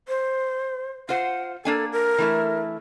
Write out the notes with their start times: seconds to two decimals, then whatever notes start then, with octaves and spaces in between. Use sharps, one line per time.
0.08 C5
1.09 F4 C5 F#5
1.65 A#3 D4 A4 G#5
1.92 A#4
2.18 E3 A3 E4